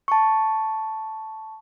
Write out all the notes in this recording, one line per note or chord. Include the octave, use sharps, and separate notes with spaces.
A5 C#6